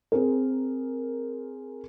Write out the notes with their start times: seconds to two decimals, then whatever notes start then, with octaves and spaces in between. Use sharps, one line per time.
0.12 C4 G#4 A#4